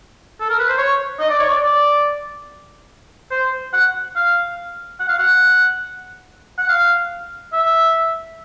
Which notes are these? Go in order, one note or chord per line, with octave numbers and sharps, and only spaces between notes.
A4
A#4
B4
C5
C#5
D#5
D5
C#5
D5
D5
C5
F#5
F5
F#5
F5
F#5
F#5
F5
E5